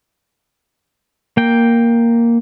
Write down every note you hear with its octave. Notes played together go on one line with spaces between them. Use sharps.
A#3 G5